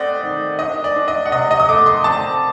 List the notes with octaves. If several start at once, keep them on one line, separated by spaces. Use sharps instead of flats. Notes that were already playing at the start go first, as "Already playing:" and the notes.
Already playing: A3 C4 D5 D#5 F#5
D#3
D4 D#5
D5
D4
D#5
F#5
C3 D#5
D#5
D#6
A3 D6
C6
C4 A5